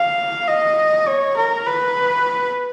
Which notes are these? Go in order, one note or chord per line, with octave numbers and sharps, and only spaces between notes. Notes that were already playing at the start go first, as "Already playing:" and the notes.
Already playing: F5
D#5
C#5
A#4
B4